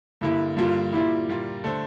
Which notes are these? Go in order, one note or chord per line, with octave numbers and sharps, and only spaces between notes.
G2 D3 G3 A#3 E4
G2 D3 G3 A#3 F4
A#2 G3 A#3 E4 F4
A#2 G3 A#3 F4
D3 A3 D4 A4 C5